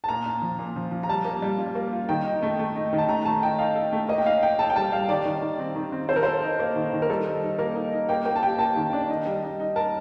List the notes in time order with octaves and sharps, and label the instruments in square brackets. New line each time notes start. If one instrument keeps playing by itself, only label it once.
[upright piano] A5
[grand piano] A#2 [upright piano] A#5
[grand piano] A#2
F3
A#2
F3
F3
[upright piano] A#5
[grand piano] G3 [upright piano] A5
[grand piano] A#3
G3
F4
A#3
F4
[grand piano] D#3 [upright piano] G5
[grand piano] D#4
A3
A3
D#4
D#3
[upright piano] A5
[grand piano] A3 [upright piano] A#5
[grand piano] A3 [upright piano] A5
[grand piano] D#4 [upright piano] G5
[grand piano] D#4 [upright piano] F5
[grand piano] A4
A3
[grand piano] A#3 [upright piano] D#5
[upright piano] G5
[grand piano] D#4 [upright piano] F5
[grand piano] D#4 [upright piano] G5
[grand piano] A4 [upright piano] A5
[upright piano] G5
[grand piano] G3 [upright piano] A5
[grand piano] G3 [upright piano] F5
[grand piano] D#3 [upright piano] D5
[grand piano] D#3
D#3
C4
D#3
C4
[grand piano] A4 [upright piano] C5
[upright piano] A#4
[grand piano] A4 [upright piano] C5
[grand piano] D#4
A#3
D#3
D#3
[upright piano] A#4
[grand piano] G3 [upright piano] A4
[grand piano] D#4
D#4
[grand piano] A#3 [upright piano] A#4
[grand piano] D#4
D#4
[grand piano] A#3 [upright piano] G5
[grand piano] A#3 [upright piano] G5
[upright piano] A5
[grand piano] G4 [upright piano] G5
[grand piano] A#3 [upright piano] A5
[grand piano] D#3
D4
D#4
G3
D#4
D#4
[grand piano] A#4 [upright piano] A5